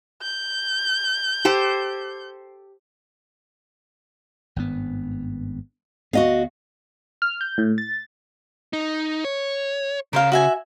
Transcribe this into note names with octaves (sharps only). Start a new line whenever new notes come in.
G6
G4 A4 C5
G#1 G2 B3
D2 B3 F#4 D#5 F5
F6
G6
A2
A6
D#4
C#5
C#3 A#4 C5 F5
F#4 E5 G#5